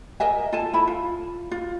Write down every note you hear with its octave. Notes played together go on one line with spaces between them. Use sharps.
A#4 D#5 E5 G#5
F4 A4 G#5 A5
E4 B5
F4
F4